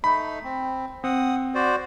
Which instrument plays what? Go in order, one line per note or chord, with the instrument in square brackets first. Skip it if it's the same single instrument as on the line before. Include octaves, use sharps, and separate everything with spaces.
[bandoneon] A3 D#4 [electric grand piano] B5
[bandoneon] C4
[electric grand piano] C4 [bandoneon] F#5 D#6
[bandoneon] F#4 C5 D5